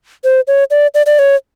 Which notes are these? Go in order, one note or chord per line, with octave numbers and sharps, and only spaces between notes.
C5
C#5
D5
D5
D5
C#5